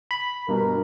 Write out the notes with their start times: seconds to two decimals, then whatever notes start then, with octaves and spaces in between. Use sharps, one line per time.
0.11 B5
0.49 G2 B2 A#4